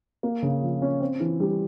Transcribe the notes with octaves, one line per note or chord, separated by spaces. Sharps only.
A#3
C#3
F3
C#4
C4
E3
G3